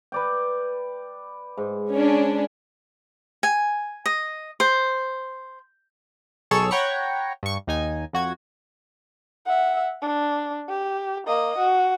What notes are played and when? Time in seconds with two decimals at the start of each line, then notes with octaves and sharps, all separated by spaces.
0.12 B4 D5 G5
1.57 G#2
1.91 C#4 D4
3.43 G#5
4.06 D#5
4.60 C5
6.51 B1 G#4 A4 C#5 C#6 E6
6.71 C#5 F#5 G5 A#5 B5 C#6
7.43 G2 C#6
7.67 D#2 D#4 G#5
8.13 F2 F#4 G#6
9.46 E5 F#5
10.01 D4
10.69 G4
11.27 A#3 D#5
11.58 F#4